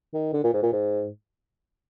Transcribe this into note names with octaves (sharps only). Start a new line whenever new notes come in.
D#3
D3
A#2
G#2
A#2
G#2